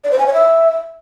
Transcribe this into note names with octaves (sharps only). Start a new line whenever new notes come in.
D5
C5
G#5
C#5
E5